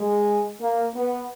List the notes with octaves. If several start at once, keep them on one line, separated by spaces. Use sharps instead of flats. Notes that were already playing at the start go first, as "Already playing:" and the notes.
Already playing: G#3
A#3
B3